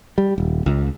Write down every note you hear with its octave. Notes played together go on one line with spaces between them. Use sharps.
G3
D#1
C#2